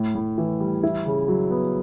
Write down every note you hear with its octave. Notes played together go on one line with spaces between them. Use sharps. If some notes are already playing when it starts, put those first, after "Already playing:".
Already playing: A2
A2
E3
G3
E4
C#3
F#3
B3